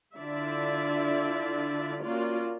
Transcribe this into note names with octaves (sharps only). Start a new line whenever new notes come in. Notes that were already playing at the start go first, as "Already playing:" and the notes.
D3 E4 F4 D5 E5
A#3 C#4 F4 F#4 D5